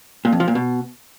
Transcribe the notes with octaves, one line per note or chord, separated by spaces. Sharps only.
A#2
F2
F3
A#2
B2